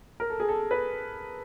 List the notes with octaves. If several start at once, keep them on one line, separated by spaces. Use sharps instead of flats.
A#4
A4
G#4
A4
B4